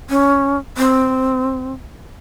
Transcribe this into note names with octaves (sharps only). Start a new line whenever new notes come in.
C#4
C4